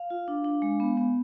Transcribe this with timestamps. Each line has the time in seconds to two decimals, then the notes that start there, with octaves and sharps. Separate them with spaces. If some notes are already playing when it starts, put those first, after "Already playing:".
Already playing: F5
0.10 F4
0.28 D4
0.45 D4
0.62 G#3
0.80 B3
0.97 B3